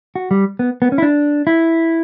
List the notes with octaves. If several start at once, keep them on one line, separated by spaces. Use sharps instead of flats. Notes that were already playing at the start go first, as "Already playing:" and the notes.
F#4
G3
B3
B3
C#4
E4
D4
E4